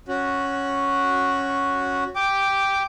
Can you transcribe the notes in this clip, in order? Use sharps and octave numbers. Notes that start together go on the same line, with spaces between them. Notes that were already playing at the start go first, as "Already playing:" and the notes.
C#4 F#4
G5 D6